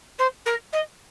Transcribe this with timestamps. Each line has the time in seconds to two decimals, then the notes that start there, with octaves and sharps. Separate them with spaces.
0.18 C5
0.45 A#4
0.72 D#5